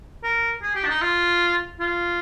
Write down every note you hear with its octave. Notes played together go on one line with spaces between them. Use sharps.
A#4
G#4
G4
D4
D#4
F4
F4